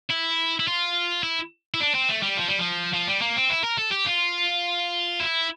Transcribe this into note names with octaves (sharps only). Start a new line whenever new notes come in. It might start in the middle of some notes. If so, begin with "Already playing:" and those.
E4
E4
F4
E4
E4
D4
C4
A3
G3
F3
G3
F3
F3
G3
A#3
C4
E4
A#4
A4
G4
F4
E4